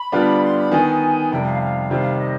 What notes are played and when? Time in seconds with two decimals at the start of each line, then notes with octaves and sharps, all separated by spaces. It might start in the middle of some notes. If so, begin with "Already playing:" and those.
Already playing: B5
0.12 D3 G3 B3 D4 F4
0.42 C6
0.57 B5
0.72 D#3 B3 D#4 G#5
1.31 F2 C3 G3 G5
1.45 F5
1.60 F5
1.90 C3 D#3 G3 C4
2.19 D#5